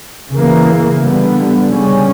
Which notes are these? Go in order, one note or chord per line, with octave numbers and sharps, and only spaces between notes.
C#3 E3 A#3
D3 G3 B3
C#3 G3 C#4